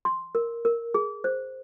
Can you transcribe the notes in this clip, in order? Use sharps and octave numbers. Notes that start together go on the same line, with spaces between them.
C6
A#4
A#4
G#4
C5